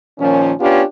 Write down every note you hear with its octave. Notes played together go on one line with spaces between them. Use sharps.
A#2 D#3 F3 C#4
B3 C#4 D4 F4 G4